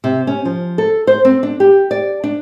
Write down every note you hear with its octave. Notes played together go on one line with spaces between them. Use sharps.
C3
C#4
F3
A4
C5
C4
D4
G4
D5
D4